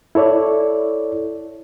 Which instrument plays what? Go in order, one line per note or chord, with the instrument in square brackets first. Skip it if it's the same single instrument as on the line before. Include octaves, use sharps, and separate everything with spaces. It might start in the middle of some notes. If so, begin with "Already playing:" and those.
[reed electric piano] E4 A4 C#5 D5